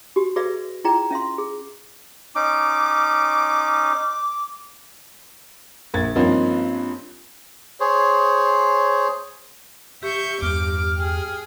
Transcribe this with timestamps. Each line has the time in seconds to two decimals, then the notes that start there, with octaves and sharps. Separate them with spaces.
0.16 F#4 G4
0.36 F#4 G#4 B4 D5 E5 F5
0.85 E4 F4 G#4 D5 G5 A#5
1.11 C#4 E5 F5 C6
1.38 G#4
2.35 C#4 D#4 D6
5.94 A#1 A#3 G#6 A6
6.16 G2 F3 A#3 C4 C#4 D#4
7.80 G#4 C5 C#5
10.03 G4 E5 C#6 G6
10.42 E2 G2 D6 F6
10.97 G#4 G5